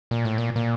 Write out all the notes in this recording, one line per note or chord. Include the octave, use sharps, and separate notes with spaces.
A#2
A2
A#2
A#2